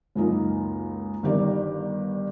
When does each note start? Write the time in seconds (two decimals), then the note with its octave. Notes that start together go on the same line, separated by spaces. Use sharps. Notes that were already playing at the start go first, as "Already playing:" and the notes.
0.15 C#2 F#2 A#3 D#4 F4
1.23 G1 D#3 G4 A#4 D5